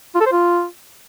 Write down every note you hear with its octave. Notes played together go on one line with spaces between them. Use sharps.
F4
A4
C5
F4